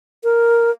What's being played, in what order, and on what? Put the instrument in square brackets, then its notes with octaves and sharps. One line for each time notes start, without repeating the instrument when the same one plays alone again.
[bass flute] A#4